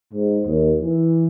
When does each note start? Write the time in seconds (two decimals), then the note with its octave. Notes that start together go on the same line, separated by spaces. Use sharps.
0.13 G#2
0.46 D#2
0.81 E3